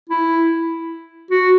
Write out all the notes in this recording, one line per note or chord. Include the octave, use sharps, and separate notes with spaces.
E4
F#4